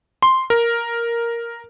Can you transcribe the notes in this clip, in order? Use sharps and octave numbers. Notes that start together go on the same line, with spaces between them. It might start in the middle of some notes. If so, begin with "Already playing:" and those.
C6
A#4